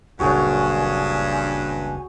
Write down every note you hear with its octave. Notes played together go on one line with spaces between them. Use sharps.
F#1 C#2 G2 A#2 F#4 G#4 C#5 G#5